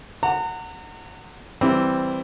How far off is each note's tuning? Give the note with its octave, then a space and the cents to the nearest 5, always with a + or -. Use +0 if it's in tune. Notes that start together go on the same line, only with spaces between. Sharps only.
F#5 +0 A#5 -35
E3 +5 G3 +0 C4 +0